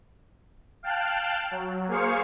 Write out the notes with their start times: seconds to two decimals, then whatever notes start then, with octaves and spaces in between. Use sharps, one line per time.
0.83 F5 G5 A5 F6 F#6
1.51 F#3
1.88 A#3 G#4 C5 F5 C#6 C#7